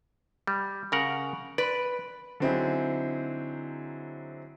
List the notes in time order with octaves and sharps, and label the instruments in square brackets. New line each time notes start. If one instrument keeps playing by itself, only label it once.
[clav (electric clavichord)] G3
C#3 A#4 F#5
[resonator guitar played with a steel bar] B4 [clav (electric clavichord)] D5
[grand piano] D3 F#3 C4 D#4 E4 G#4